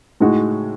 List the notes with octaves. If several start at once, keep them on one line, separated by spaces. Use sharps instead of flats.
A2 G#3 D#4 F#4